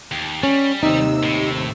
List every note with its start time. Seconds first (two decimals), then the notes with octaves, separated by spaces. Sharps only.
0.11 D#2
0.43 G3 C#4
0.83 D#2 C3 D#4 E6
1.23 A2